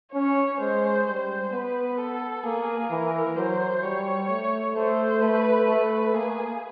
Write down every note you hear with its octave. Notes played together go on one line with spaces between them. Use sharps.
C#4 C#5
G#3 C5
G3 C5
B3 B4
A4
A#3 G#4
E3 A#4
F#3 C5
G3 C#5
A3
A3 C5
A3 B4
A3 B4
A#3 G#4